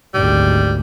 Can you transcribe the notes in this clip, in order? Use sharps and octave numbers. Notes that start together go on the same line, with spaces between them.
G#1 D2 G3